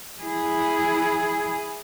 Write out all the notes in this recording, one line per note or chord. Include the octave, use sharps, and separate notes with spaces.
E4 G#4